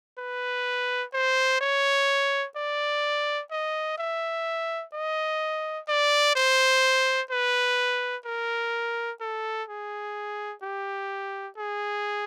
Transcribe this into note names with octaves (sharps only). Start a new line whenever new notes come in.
B4
C5
C#5
D5
D#5
E5
D#5
D5
C5
B4
A#4
A4
G#4
G4
G#4